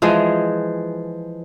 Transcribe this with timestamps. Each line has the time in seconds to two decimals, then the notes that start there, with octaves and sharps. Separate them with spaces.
0.02 E3 F3 G#3 G#4